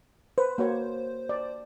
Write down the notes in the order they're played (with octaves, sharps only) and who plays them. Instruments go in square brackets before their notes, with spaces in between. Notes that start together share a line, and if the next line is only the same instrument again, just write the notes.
[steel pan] B4 [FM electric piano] C5
[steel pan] A#3 F#4 C#5
D5